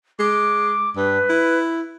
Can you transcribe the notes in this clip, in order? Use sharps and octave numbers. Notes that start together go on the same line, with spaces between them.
G#3 D6
G2 B4
E4